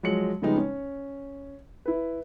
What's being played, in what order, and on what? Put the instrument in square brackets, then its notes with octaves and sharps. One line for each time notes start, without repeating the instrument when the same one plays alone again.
[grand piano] F3 F#3 G#3 C#7 F#7
C#3 F3 G3 G#3 B3 D#4
C#4
E4 B4